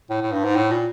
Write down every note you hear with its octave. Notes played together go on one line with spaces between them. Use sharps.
A2
A2
G2
G#2
A2
A#2